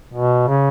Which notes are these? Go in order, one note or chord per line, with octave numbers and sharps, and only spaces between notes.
B2
C#3